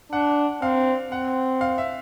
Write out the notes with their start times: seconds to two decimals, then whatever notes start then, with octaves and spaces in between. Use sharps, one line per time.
0.12 D4 F#5
0.62 C4 F5
1.12 C4 F#5
1.61 F5
1.78 E5